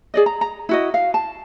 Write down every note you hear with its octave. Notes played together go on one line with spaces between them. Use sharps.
G#4 D5 D#5
A#5
A#5
E4 F#4 D#5
F5
A5